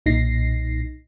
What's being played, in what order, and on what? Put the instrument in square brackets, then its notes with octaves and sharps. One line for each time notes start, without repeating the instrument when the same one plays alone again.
[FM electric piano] B1 A#2 D#4 A#6 C7